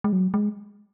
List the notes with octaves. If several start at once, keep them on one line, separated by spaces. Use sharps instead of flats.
G#3
F#3
G#3